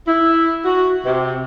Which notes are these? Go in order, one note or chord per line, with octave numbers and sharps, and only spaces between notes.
E4
F#4
C3